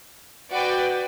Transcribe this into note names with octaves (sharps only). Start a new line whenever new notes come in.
F#4 B4 D5 G5